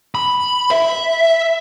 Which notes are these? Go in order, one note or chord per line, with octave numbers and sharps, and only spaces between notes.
B5
E5